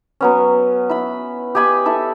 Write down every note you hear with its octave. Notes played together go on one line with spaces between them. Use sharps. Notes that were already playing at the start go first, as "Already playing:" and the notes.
F#3 B3 C#4
E4 B5
G4 D#5 G#5 B5
E4 A4